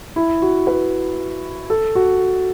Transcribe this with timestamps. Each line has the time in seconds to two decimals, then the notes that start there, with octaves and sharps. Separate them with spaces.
0.16 E4
0.42 F#4
0.67 B4
1.70 A4
1.95 F#4